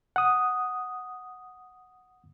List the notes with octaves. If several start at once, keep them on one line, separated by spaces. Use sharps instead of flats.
F#5 D#6